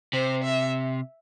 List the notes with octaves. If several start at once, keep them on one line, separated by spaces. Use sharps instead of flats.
C3 C5
E5